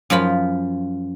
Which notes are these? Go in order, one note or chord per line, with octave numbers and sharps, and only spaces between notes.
F#2 F3 F4 B5